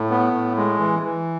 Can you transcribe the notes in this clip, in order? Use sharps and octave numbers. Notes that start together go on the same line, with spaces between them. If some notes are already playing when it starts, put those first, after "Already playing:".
Already playing: A2
B3
A2
G#3
E3
E3